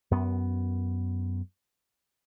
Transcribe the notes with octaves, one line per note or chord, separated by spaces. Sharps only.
F#2 B3